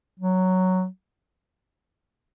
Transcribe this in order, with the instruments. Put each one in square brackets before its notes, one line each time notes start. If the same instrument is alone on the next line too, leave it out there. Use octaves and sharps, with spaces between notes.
[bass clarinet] F#3